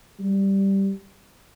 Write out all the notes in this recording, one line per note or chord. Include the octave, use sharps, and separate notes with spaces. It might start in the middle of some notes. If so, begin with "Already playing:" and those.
G3